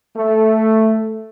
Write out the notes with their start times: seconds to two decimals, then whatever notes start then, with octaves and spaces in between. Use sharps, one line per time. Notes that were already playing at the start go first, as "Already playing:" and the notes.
0.16 A3